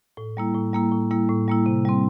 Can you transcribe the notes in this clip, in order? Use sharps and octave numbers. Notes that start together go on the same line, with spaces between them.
A2
G3 A#3 E4
A2
G3 A#3 E4
A2
G3 A#3 E4
A2
G3 A#3 E4
C3
G3 C4